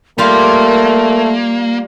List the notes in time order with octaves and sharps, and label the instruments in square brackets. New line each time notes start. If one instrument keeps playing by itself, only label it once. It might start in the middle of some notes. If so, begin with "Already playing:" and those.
[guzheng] G3 F4 [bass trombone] A3 [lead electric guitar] A#3 [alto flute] A#4